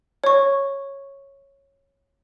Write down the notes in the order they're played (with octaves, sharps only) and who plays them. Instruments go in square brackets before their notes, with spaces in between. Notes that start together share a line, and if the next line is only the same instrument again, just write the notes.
[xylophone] C#5 C#6